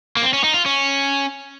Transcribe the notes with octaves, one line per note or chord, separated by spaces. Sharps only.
A#3
C4
C#4
D#4
F4
C#4